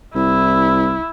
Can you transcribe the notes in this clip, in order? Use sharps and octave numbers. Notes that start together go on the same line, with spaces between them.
C2 E4